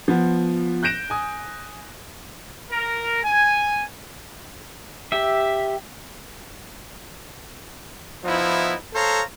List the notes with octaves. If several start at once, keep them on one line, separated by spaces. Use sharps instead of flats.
F3 B3
F#6 G6 A#6 D7 E7
G#5 D#6
A#4
G#5
G4 E5
F3 B3 D#4 E4
A4 C5 C#5 F5 A#5